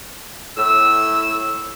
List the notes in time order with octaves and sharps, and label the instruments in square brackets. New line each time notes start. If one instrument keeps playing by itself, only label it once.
[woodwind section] A2 E6